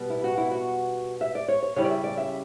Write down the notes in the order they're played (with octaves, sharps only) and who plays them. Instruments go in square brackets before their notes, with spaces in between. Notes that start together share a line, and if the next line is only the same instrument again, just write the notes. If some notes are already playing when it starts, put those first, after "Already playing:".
Already playing: [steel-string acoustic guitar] B2 G3 B3
E4
F#4
E4
F#4
E5
D5
C#5
C#5
C#3 G3 C#4 E4 C#5
D5
E5
D5
E5